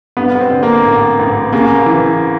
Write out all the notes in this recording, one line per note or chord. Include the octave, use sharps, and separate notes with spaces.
G2 B3
B3
C4
D3
A#3
A1
A1
C#3 A#3
E3